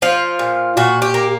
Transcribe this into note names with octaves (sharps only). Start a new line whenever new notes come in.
F3 F4
A#2
A#2 F#4
G4
A#3